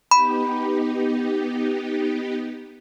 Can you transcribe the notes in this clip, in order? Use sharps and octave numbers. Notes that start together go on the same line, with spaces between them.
B3 D#4 G4 B5